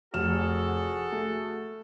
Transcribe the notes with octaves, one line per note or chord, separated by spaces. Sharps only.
F1 F#4 G#4 A4 F6 E7
A3